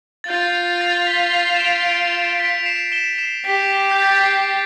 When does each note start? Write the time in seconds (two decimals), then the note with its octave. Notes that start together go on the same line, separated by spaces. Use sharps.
0.24 A6
0.28 F4 G6
0.81 A6
1.07 B6
1.34 C7
1.55 E7
1.60 D7 F7
1.86 D7 F7
2.04 F7
2.13 C7 E7
2.39 B6 D7
2.58 F7
2.66 C7 E7
2.92 E7 G7
3.18 C7 E7
3.45 G4 B6 D7
3.91 G6
4.02 A6
4.13 B6
4.24 C7